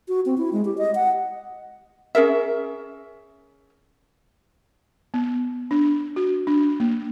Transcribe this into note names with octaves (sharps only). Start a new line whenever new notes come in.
F#4
C4
E4
G#3
G4
D#5
F#5
C#4 G#4 A#4 E5
B3
D4
F#4
D4
A#3